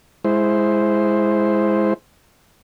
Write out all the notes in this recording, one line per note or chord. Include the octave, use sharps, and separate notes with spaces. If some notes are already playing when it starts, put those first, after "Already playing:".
G#3 E4 C5